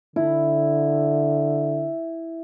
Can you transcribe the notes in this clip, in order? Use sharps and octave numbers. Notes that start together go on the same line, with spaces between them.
D3 E4